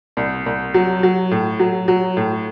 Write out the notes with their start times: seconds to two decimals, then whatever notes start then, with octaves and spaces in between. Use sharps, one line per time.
0.17 C2
0.46 C2
0.74 F#3
1.03 F#3
1.31 A2
1.60 F#3
1.88 F#3
2.17 A2